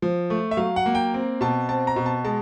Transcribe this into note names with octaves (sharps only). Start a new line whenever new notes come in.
F3
A3
E5
F#3 F5
F#5
A#3
G5
C4
B2 A5
C4 A5
A#5
B2
A5
G#3 A5